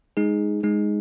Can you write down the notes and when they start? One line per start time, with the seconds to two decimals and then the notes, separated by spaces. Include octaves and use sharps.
0.17 G#3 D#4 G#4
0.63 G#3 D#4 G#4